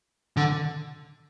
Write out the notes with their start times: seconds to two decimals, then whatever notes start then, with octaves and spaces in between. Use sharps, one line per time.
0.37 D3